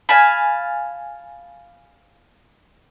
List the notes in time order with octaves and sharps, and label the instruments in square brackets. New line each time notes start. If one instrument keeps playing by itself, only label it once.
[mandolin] F5 G#5 A5 B5